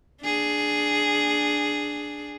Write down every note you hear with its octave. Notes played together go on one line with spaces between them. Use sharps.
D4 G#4